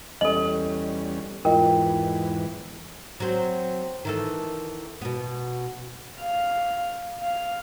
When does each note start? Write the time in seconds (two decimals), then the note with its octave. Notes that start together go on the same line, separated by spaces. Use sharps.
0.21 E2 G3 C#4 A4 D#5 F#7
1.45 E2 G#2 E3 F4 A#4 D#5 G5
3.20 F#3 C4
4.05 D#3 E3 A4
5.02 B2 B3
6.22 F5
7.22 F5